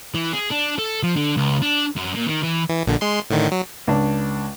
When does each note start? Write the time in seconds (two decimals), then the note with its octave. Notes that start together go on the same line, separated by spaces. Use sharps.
0.15 E3
0.33 G#4
0.50 D4
0.78 A4
1.03 F3
1.16 D3
1.37 C#2
1.62 D4
1.96 F#2
2.15 A#2
2.27 D#3
2.43 E3
2.69 E3
2.86 A#1 A#2 D3
3.01 G#3 C6
3.30 A2 D3 D#3
3.52 F#3
3.87 C#2 D4